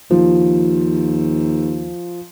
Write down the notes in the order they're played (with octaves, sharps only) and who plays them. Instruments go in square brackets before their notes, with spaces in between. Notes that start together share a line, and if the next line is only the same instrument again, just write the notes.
[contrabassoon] D#2 [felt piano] F3